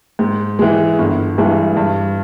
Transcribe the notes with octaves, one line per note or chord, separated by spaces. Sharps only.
G#2
E3 G#3
G1
G2 E3 G#3
G2